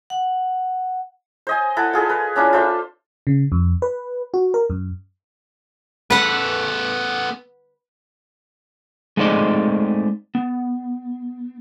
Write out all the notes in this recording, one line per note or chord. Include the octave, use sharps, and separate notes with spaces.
F#5
C5 D#5 G#5
E4 A4 F#5
F4 G#4 A4 D#5
A#4 B4
C#4 D4 E4 F4
F4 A4 C5 E5
C#3
F2
B4
F#4
A#4
F#2
B3 A4 B4 F#5
G#3 A3 C4 D#4 D5 D#5
B3